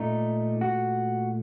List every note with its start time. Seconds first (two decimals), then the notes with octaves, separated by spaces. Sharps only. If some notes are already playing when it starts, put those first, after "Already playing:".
Already playing: A#2 A3 D#4
0.61 F#4